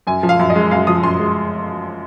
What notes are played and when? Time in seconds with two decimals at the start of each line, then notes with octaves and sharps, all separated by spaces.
0.07 F#2 G#5
0.23 F3
0.29 F5
0.39 F#2
0.50 D#5
0.55 G#3
0.71 F#2 F5
0.87 F3 D#6
1.03 F#2 C6
1.19 G#3